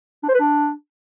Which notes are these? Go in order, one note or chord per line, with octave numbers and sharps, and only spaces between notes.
D4
C5
B4
D4